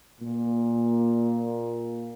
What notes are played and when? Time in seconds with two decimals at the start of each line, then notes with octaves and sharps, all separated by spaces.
0.21 A#2